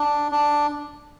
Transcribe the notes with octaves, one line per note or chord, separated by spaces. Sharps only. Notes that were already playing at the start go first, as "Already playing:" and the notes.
Already playing: D4
D4